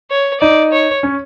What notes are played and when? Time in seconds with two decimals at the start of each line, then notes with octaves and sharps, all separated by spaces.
0.11 C#5
0.41 D#4 D5
0.72 C#5
1.03 C#4